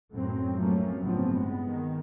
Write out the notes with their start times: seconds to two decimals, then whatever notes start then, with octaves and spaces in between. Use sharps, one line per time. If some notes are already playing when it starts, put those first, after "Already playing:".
0.14 F#2 A2 F#3 C4
0.56 F3 F#3 A3 A#3 C4 C#4
1.02 G1 A2 C#3 F3 B3 C4
1.33 G#3 B3
1.67 D#3